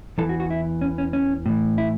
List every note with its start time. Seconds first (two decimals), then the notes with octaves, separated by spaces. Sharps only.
0.18 E2 E3 A4
0.29 F#4
0.40 F#4
0.50 E4
0.81 C#4
0.98 C#4
1.13 C#4
1.46 A2 E3
1.78 E4